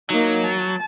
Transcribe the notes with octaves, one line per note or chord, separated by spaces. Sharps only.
F#3 A#3 D#4
A5